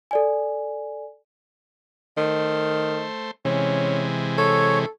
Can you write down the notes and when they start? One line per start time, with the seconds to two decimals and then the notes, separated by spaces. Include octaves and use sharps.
0.11 A4 D5 G#5
2.17 D#3 A3 C5
3.45 C3 E3 G#3 C#4
4.38 A4 C#5